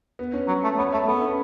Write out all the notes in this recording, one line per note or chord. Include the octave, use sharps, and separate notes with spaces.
B3
C#4
F#3
A3
B3 C#5
A3 E5
B3 A4
C#4